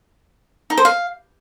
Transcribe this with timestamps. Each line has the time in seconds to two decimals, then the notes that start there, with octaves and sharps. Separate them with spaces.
0.70 D#4
0.77 C5
0.85 F5